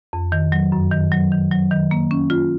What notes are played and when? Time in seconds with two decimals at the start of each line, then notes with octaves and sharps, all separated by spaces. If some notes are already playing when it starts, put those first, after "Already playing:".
0.13 F2
0.32 D#3
0.52 F#3
0.72 F#2
0.91 D#3
1.12 F#3
1.32 D#3
1.51 F#3
1.71 D#3
1.91 A#3
2.11 C#4
2.30 F4